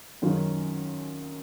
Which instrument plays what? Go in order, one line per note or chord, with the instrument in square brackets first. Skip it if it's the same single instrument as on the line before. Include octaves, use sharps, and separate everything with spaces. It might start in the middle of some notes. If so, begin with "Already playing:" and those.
[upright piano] F#2 D#3 F#3 C#4 F4